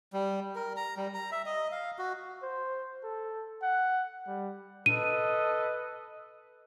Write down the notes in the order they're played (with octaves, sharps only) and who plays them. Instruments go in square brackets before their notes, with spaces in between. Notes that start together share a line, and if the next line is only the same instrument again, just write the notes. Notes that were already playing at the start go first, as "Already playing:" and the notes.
[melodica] G3
A#4
A#5
G3
A#5
E5
D#5
F5
F#4
[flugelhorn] C5
A4
F#5
G3
[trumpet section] A4 B4 D#5 [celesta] D#7